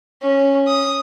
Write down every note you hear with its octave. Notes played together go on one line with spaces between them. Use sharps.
C#4
D#6